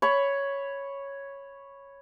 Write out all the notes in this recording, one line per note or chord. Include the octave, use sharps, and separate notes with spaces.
C#5 B5